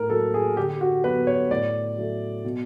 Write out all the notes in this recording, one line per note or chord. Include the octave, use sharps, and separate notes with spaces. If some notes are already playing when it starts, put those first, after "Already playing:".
Already playing: A2 A#4
F#3 A#3 A4
G#4
D3 G4
F#4
F#3 B3 B4
C#5
A2 D5
F#3 A3
B2